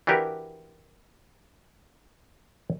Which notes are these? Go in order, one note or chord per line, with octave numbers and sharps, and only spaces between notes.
E3 D4 F#4 G4 A#4 B4